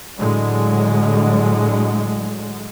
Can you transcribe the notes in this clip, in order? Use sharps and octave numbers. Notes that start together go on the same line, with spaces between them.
A2 D3 F#3 G#3